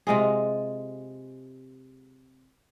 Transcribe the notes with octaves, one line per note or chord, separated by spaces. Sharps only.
C3 G#3 F4 G#4